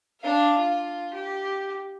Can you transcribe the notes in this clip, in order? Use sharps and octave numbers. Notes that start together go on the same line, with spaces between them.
D4 F5
F4
G4